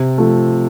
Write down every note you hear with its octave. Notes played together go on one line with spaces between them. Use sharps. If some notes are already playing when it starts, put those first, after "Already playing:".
Already playing: C3
F3 A3